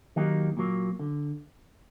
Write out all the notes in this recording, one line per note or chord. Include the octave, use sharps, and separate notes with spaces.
D#3 F#3 A#3 D#4 G4
A#2 F#3 A#3
D3